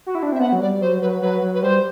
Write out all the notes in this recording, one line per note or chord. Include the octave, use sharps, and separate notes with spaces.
F#4
E4
D4
C4 E5
B3 F#5
F#3
G3 D5
F#3 C5
F#3 B4
F#3 B4
F#3
B4
G3 C5